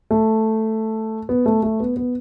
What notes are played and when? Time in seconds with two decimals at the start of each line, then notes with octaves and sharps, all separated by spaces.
0.11 A3
1.29 B3
1.46 A3
1.63 A3
1.80 B3
1.97 B3